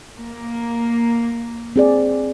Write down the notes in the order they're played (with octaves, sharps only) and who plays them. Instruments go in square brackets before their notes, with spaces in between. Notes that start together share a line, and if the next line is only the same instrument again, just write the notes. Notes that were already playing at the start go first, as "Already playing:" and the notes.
[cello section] A#3
[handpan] C4 G#4 D5